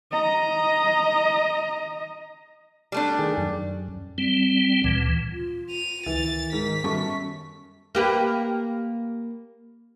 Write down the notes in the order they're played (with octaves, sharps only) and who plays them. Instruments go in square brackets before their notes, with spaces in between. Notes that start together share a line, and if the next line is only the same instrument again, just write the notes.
[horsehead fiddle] D#5 A#5
[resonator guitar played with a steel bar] G3 A3 D4
[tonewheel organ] D#3 G#4
F#2
G3 C4
D2 A#2 E3
[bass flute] F4
[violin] D#7 F7
[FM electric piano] C#2 [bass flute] D#3 [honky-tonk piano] E3 [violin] A6
[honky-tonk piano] G#2 [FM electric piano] A#4 [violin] B6
[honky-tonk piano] F#2 A4 C#6 [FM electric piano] G3 B3 C#4
[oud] A#3 G4 B4